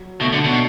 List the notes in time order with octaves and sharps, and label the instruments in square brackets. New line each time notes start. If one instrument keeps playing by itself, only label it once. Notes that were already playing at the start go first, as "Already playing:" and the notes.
Already playing: [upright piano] F#3
[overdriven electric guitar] B2 [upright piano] A3
[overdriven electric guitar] D3
[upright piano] D4
[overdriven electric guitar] B2